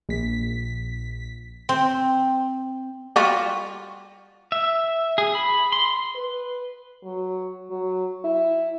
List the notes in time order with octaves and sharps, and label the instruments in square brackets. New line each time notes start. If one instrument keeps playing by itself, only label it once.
[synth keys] A#1 B6
[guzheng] C4
[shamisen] G3 F4 F#4
[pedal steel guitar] E5
G#4
B5
C6
[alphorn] B4
F#3
F#3
E4